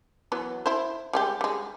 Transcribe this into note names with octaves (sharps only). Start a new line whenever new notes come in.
E3 F#3 B3
E4 C5
G3 G#3 G4
G3 G#3